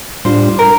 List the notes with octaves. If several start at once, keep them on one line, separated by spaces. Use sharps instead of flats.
A2 G3 D4 F4 C5
A#4